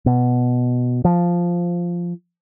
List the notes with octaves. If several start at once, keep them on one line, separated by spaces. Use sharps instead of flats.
B2
F3